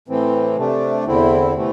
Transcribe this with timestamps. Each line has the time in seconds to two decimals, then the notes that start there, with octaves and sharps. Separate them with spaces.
0.08 A2 E3 C4
0.56 C3 A3 D4
1.05 E2 D3 C4 E4
1.54 C3 E3 A3